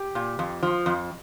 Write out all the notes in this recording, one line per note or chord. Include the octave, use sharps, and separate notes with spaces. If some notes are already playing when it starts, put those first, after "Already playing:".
Already playing: G4
A#2
F2
F3
F2